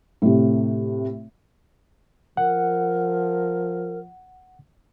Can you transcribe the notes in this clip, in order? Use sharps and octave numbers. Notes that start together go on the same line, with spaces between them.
A2 C3
F3 A#4 F#5